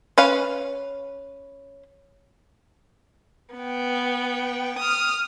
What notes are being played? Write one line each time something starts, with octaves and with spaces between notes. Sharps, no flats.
C#4 B4 F5
B3 G5
D#6 F6